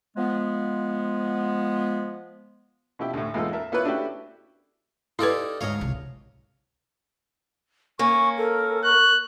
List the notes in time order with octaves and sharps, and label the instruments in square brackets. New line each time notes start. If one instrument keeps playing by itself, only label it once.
[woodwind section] F3 G#3 B3
[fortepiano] B2 F3 E4 G4
D2 A2
E2 G#3 D#4 F4 A4
A#4 E5 A5
A#3 B3 E4 F4 B4 C#5
A3 D4 E4 F#4 G4
[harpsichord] D#4 A4 D5 [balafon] E4 B4 [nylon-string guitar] G4 F5
[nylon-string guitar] D2 G#2 D#5 [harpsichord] C#5 F5
[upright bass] C2
[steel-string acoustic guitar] A#3 C#4 [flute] C#6
[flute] A4 [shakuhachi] A#4
[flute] C#6 [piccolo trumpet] F#6